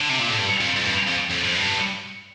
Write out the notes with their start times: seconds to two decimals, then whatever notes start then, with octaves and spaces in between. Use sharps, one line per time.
0.01 D3
0.10 C3
0.19 A#2
0.29 A2
0.38 G2
0.61 F2
0.77 F2
0.85 G2
1.08 F2
1.31 F2
1.45 F2
1.55 G2